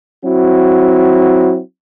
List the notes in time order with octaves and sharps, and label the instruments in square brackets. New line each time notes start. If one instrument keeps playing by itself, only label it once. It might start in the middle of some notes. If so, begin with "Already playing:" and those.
[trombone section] F#3 C4 E4 F#4